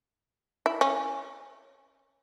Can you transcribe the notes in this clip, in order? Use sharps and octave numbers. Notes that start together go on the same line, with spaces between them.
E4
C#4